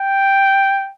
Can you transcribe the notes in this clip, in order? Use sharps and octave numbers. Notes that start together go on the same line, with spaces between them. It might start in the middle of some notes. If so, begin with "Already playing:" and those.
Already playing: G5